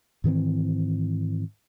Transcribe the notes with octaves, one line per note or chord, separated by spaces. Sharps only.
G#2 D#3 E3 C4